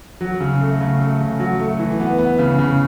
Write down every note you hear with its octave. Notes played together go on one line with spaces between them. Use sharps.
F#3
C#3
A3
C#3
A3
C#3
F#3
A3
E3
B3
B3
C#3
C#3